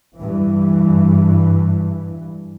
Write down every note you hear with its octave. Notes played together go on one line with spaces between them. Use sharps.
G2 E3